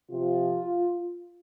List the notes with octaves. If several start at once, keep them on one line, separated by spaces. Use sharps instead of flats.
C3 F3 F4